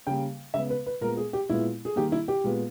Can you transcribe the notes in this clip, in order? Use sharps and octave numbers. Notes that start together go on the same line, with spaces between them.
C#3 G3 A#3 G5
C#3 G#3 B3 E5
B4
B4
A#2 G#3 B3 A#4
G#4
G4
A#2 G#3 B3 E4
G#4
D#3 G3 A#3 G4
E4
G4
A#2 G#3 B3